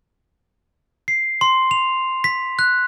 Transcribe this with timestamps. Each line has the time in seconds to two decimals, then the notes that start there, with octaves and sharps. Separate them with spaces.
1.08 C7
1.41 C6
1.71 F7
2.24 B6
2.59 F#6